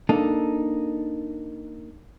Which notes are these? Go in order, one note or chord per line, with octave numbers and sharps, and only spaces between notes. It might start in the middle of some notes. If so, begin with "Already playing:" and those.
A#3 D4 D#4 A4